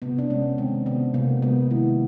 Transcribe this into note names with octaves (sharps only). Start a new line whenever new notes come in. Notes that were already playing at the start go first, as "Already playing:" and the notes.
C3 B3
D4
G#3 C#4
D#3 C4
C3 B3
C3 A#3
G#3 B3
D#3 E4